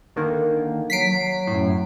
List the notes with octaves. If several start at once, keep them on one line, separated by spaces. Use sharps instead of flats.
D3 D#3 A#3
F#3 B6 C7 D7
F#3
F#2 A2